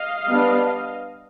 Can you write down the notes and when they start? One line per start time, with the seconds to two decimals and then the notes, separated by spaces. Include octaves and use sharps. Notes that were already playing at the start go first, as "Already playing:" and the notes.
Already playing: D#5 F5
0.29 G3 B3 D4